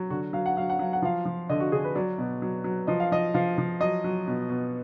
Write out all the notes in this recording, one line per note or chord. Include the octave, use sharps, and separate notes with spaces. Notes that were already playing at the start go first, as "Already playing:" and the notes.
Already playing: F#3
D3 F#4
F#3 F5
F#5
F#3 F5
F#5
F#3 F5
F#5
F3 F5
F3
D3 D#5
F#4
D3 G#4
B4
F#3 D5
B2
F#3
F#3
F3 D#5
F5
F3 D#5
F3 F5
F3
F#3 D#5
F#3
B2
B2